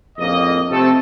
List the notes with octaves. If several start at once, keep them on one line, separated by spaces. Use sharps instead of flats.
A#1 F2 A2 C#3 A#3 D#5
C3 A3 C4 A4